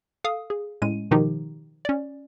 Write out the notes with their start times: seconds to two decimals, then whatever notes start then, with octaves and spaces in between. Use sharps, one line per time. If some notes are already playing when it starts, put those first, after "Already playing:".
0.24 A4 F5 D#6
0.50 G#4
0.82 A2 G#3 C#4 D#7
1.11 B2 D#3 F3 D#4 G4
1.85 C#4 D5